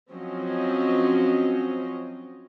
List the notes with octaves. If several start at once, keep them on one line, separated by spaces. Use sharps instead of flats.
F3 F#3 C4 C#4 D#5